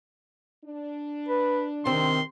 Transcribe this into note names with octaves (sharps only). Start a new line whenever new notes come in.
D4
B4
C3 D#3 C4 C6